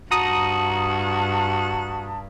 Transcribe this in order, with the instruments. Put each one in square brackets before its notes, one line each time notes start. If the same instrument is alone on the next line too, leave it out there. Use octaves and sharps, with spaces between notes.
[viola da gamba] G2 [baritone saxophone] F#4 [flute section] A5 [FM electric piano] A#5 D#6